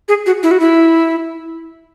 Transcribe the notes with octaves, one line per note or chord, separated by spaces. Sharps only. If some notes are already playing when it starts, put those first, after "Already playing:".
G#4
F#4
E4
F#4
E4